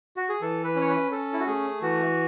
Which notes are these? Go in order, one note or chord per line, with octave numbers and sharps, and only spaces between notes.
F#4
G#4
E3 A4
B4
C#4
C#5
B4
C#4 A4
E4
F#4
A3 G#4
E3 F#4